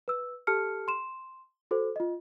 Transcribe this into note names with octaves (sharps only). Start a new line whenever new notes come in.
B4 E6
G4 A4 A5 F6 C#7
C6 E7
F#4 A4 C5
F4 D#5